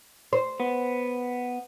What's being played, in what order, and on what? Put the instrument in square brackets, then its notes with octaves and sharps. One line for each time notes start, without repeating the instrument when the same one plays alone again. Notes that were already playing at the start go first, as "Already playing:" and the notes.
[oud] C5
[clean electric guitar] B3